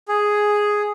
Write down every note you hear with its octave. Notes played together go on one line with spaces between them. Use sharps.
G#4